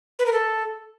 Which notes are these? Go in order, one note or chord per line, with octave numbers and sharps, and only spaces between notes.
B4
A#4
A4